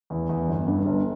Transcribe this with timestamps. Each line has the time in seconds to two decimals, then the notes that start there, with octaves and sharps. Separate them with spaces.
0.10 E2
0.29 E2
0.48 G1
0.67 G2
0.86 G1